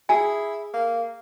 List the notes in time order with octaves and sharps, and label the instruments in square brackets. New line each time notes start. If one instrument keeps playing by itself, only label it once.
[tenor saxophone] E4 [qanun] G#4 [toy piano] G#5
[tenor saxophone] A#3